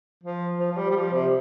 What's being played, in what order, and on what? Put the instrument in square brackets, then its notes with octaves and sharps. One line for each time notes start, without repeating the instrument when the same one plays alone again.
[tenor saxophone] F3
F3
F3
G3
G3
F3
C3